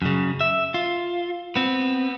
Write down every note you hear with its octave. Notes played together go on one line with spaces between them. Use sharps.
F#2 C#3
E5
F4
B3 C4